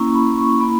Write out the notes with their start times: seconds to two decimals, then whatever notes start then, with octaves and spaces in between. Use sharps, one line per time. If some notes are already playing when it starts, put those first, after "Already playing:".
Already playing: A#3 C#4 E4 C#6
0.14 B5
0.38 C#6
0.60 A#3 E4 B5